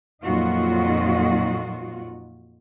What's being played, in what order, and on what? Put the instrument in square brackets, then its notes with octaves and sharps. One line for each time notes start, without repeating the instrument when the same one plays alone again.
[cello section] F2 A#2 F#3 D#4 F4 F#4